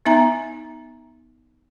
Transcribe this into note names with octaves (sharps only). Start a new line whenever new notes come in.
B3 D#4 E5 G#5 A#5